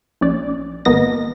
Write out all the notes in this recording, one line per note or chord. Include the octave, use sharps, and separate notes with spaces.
A#1 C#4 D5
G#1 A#3 B3 D#5 A#6